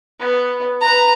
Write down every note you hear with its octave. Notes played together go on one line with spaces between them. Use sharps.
B3
B4 A#5